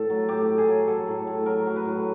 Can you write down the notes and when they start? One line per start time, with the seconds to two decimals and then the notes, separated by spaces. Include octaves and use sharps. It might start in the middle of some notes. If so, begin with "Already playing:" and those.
Already playing: A2 A4
0.10 F#3
0.29 A2 G4
0.49 A2
0.58 G#4
0.68 F#3
0.88 F#3 A4
1.07 A2
1.27 A2
1.46 F#3 A#4
1.66 F#3
1.76 B4
1.86 A2